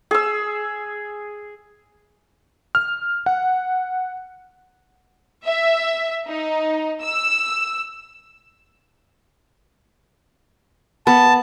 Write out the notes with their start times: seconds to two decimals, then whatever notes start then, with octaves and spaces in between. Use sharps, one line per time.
0.11 G#4 E6
2.75 F6
3.26 F#5
5.45 E5
6.28 D#4
7.04 E6
11.07 B3 A5